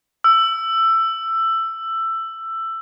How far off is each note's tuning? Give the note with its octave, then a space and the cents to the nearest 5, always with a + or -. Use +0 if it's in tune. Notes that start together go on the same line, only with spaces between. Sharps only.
E6 +15